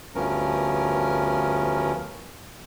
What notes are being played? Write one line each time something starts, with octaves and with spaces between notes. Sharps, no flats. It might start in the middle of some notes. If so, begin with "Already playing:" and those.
D2 G2 F3 B3 C#4 A#4